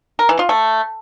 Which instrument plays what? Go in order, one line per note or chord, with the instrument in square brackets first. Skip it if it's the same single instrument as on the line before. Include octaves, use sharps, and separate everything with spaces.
[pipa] A#4
E3
F4
A3